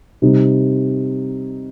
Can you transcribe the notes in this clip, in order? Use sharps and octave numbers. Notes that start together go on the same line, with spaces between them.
C3 G3 C4 D#4